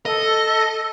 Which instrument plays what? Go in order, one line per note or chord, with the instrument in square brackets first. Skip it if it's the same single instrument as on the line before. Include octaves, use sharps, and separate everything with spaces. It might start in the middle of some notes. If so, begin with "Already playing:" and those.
[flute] A4 [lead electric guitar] D#5